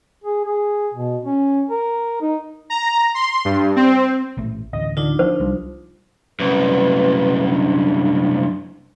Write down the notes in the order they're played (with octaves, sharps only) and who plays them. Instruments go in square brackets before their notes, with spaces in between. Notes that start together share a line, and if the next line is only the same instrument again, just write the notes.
[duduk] G#4
G#4
B2
C#4
A#4
D#4
[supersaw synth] A#5
C6
G2
C4
[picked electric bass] A1 A#2 A3
[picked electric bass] A1 D2 [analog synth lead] D#5
[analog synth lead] D3 [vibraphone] D4 D#4 F4
[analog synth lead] F3 [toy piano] C5
[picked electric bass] C2 G3
[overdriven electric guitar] C2 F#2 [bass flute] B4
[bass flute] D4